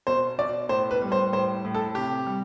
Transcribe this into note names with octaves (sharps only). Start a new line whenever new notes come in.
B2 C5
B2 D5
A2 C5
B4
G3
C5
A2 C5
A2
A4
C3 G4
G3